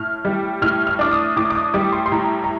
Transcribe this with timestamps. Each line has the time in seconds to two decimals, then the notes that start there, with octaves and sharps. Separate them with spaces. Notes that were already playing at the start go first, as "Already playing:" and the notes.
Already playing: A2 F6
0.25 G3
0.62 A2 F6
0.87 F6
0.99 D4 D6
1.12 D#6
1.36 A2 D6
1.50 D6
1.55 D#6
1.74 G3 D6
1.92 C6
2.06 C6
2.12 A2 A#5
2.44 A#5